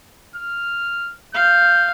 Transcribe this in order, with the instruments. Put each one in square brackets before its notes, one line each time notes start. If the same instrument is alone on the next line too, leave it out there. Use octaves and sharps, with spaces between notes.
[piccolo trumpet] F6
[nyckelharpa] F5 [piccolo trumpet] G6